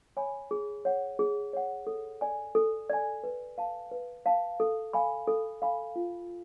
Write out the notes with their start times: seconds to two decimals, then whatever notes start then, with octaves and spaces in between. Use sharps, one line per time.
0.17 C#5 G#5 B5
0.51 G#4
0.85 C#5 F#5
1.19 G#4
1.53 C#5 F#5
1.87 A4
2.21 D5 G#5
2.55 A4
2.90 D5 G#5
3.24 B4
3.58 F5 A5
3.91 B4
4.26 F5 A5
4.60 A4
4.93 F5 G#5 B5
5.27 A4
5.62 F5 G#5 B5
5.96 F4